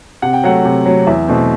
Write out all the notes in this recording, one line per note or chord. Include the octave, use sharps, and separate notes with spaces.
C3 F#5
G5
F#3 A3 F#5
C3
F#3 A3
E2 E5
B2 A3 C4